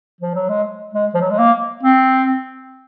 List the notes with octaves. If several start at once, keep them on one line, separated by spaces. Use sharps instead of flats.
F3
F#3
G#3
G#3
F3
F#3
G#3
A#3
C4